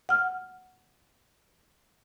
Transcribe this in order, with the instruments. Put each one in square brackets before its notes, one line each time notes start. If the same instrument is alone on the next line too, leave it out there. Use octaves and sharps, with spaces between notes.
[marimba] F#5 F6